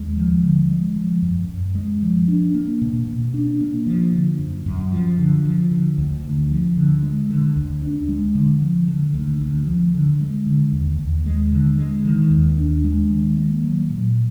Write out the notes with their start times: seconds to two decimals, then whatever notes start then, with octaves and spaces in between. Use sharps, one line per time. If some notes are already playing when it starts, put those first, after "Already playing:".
Already playing: D#2 G#3
0.17 F3
0.43 D3
0.70 G#3
0.96 F3
1.23 F#2
1.49 F#2
1.75 G#3
2.02 F3
2.28 D4
2.54 A#3
2.82 B2
3.07 B2
3.34 D4
3.61 A#3
3.87 F3
4.12 D3
4.39 F#2
4.66 F#2
4.92 F3
5.18 D3
5.45 F3
5.71 D3
5.98 D2
6.25 D2
6.51 F3
6.77 D3
7.03 G#3
7.30 D3
7.56 D2
7.82 D4
8.09 G#3
8.35 D3
8.62 F3
8.88 D3
9.14 D2
9.41 D2
9.67 F3
9.94 D3
10.21 G#3
10.46 D3
10.73 D#2
10.99 D#2
11.26 G#3
11.52 D3
11.78 G#3
12.05 D#3
12.31 D#2
12.57 D4
12.84 G#3
13.10 D#3
13.37 A#3
13.64 F#3
13.90 A#2